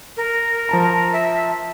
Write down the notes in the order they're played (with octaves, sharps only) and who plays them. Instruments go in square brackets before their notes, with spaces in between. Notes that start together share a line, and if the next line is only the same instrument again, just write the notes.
[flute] A#4
[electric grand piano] F3 A5 A#5
[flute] E5